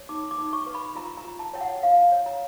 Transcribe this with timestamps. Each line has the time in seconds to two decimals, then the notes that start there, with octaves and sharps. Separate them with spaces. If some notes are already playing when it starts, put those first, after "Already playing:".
Already playing: C#5
0.09 D#4 D6
0.31 D6
0.38 D#4
0.53 C#6
0.66 B4
0.75 B5
0.95 F4 A#5
1.17 A#5
1.25 F4
1.39 A5
1.53 C#5 G5
1.61 F#5
1.83 E4 F5
2.12 C#5
2.26 A#5